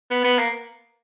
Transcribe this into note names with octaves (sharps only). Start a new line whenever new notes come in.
B3
B3
A#3